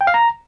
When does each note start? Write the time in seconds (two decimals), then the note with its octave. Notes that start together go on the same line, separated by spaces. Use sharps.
0.01 G5
0.07 F5
0.14 A#5